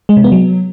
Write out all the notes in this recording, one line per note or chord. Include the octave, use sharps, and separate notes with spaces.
G#3
C3
B3
F#3